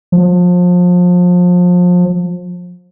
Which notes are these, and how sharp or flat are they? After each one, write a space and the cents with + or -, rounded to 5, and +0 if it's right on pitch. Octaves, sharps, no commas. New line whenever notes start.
F3 +30